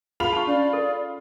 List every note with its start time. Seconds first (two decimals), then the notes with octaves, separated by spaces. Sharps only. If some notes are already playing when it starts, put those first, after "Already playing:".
0.20 F4 G#4 B5 F7
0.33 A5 C#6
0.47 C#4 D5
0.73 A4